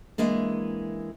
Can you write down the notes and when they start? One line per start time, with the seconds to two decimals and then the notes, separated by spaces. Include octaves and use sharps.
0.18 E3 G#3 A#3 D4